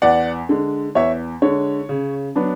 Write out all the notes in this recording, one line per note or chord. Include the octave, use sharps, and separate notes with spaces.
E2 D5 F#5
D3 G#3
E2 C#5 E5
D3 G#3 C#5
C#3
F#3 B3 D4